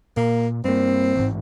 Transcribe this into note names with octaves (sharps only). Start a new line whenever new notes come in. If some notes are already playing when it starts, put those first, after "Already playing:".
A#2 A#3
G2 A#3 C4
A1 G#2